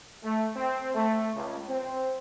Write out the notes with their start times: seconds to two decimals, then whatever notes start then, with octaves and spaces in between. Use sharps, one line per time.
0.23 A3
0.55 C4
0.94 A3
1.35 C#2
1.69 C4